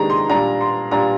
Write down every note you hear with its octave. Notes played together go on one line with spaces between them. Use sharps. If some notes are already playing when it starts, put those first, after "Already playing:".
Already playing: C3 D#3 G#3 D4 A#5
C6
A#2 G3 D4 A#5
C6
A#2 G3 D4 A#5